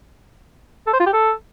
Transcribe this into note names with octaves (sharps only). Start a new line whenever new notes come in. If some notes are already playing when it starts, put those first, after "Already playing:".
A4
C5
F4
G4
A4